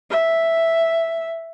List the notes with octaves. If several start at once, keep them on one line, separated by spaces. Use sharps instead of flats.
E5